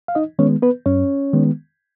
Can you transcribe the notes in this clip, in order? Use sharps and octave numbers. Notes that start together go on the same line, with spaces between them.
F5
D#4 D#5
D#3 G#3 B3 C#4 C#5
B3 B4
F#2 C#4 C#5
D#3 G#3 B3